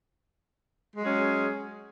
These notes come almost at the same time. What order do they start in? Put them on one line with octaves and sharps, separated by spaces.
G#3 F#3 G#4 C#4